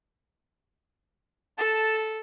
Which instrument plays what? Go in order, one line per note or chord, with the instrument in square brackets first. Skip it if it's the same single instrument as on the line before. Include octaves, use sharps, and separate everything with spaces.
[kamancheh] A4 [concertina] A5